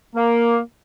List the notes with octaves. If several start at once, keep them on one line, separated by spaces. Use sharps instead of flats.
A#3